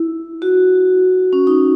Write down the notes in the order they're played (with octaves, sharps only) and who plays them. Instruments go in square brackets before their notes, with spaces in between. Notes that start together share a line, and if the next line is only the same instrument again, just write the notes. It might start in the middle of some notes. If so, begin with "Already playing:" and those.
Already playing: [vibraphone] E4
F#4
C#4
D#4